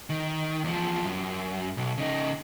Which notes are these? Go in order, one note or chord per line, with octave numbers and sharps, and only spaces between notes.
D#3
E2 F3
F#2
B1
C#3 D#4